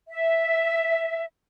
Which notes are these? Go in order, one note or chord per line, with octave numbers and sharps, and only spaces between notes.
E5